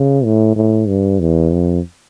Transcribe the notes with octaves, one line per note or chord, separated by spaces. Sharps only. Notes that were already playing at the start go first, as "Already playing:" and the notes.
Already playing: C#3
A2
A2
G2
E2
F2